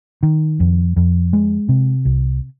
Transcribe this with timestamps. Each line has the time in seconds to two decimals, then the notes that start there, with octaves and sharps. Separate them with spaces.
0.23 D#3
0.60 F2
0.96 F2
1.33 G#3
1.69 C3
2.05 C2